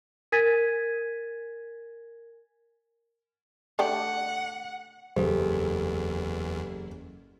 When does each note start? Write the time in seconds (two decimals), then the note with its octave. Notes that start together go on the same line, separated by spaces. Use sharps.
0.32 A#4 G#5 G#6 A6 B6 D#7
3.79 A3 D4 G4 F#5
5.16 F#1 E2 G4 A4 C5